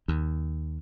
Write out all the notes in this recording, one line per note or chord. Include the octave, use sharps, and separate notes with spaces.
D#2